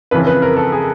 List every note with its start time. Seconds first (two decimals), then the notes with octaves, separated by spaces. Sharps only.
0.11 F2 C#3 E3 B4
0.27 B4
0.42 A#4
0.57 A4
0.72 G#4